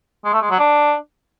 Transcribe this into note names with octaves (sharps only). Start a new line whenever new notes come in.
G#3
A3
G#3
F#3
D4